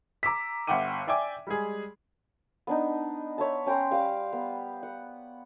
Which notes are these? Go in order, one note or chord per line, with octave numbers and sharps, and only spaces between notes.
A#5 D6 E6 B6
G1 E5 F#5 G5 D6 D#7
D5 E5 G5 G#5 D6
G3 G#3 G#4
B3 D4 D#4
C#5 E5 A5
C#4 G5 A#5 C6
G3 F5 D6
B3
F#5